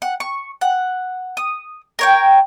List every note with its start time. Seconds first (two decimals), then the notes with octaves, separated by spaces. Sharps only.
0.02 F#5
0.20 C#6
0.61 F#5
1.37 D#6
1.99 A#4 C#5 G5